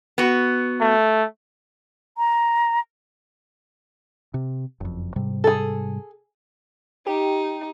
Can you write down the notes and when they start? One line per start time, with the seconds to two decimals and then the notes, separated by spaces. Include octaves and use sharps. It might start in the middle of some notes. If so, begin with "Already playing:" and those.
0.18 B3 F#4
0.81 A3
2.17 A#5
4.34 C3
4.81 F#1 F2
5.16 G#2 C3 G3
5.44 G#4 A4
7.07 D#4 G4